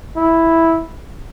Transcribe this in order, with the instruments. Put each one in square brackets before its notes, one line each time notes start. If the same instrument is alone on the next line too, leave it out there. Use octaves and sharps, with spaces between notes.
[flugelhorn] E4